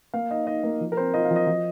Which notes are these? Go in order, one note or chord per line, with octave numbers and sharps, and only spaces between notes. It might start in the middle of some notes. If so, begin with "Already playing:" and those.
A#3 F5
D#4 D#5
D#4 D#5
A#3
F3
A#4
C4 C5
F4 D#5
F5
F3
D#5
F3